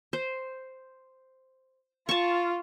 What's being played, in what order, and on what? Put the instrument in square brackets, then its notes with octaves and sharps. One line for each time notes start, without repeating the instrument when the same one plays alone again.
[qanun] C5
[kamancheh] F4 [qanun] A5 C#6